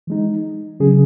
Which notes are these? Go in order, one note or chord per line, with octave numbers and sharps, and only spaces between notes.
E3 G#3 D#4
C#3 F#3 C#4 G#4